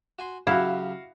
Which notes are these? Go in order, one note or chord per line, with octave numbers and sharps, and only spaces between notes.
F#4 G#5 C6
C#3 F#3 E4 F#4 G4 F5